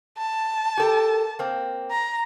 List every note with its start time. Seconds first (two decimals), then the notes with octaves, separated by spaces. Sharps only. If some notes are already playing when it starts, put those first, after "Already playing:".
0.18 A5
0.77 G4 A4 A#4
1.39 A#3 C4
1.91 A#5